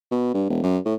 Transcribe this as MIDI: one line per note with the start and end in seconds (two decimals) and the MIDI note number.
0.11 0.33 47
0.34 0.44 43
0.50 0.62 28
0.63 0.78 42
0.85 0.94 45